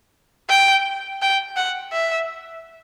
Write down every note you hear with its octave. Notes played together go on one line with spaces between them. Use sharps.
G5
G5
F#5
E5